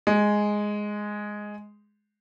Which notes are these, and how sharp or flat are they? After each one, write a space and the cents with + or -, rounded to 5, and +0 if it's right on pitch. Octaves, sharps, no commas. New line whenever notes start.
G#3 +0